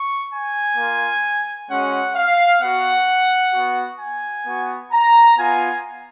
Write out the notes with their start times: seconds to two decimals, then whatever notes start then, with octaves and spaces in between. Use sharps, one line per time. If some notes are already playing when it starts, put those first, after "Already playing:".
Already playing: C#6
0.31 G#5
0.76 A#3 F4
1.68 G#3 C#4 F#4 F#5
2.14 F5
2.60 B3 F#4 F#5
3.52 B3 F#4
3.98 G#5
4.45 B3 F#4
4.92 A#5
5.37 B3 F4 G#5